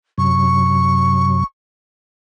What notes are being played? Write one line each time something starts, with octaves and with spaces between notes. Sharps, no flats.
F#2 C3 F#3 C#6